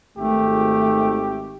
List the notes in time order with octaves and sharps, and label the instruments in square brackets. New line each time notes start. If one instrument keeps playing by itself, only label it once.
[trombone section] G#1 [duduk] A3 [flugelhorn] G4